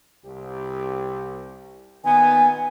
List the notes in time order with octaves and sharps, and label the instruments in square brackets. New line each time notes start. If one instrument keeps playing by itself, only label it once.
[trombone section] C2 G4
[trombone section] A#2 D#3 B3 [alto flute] G#5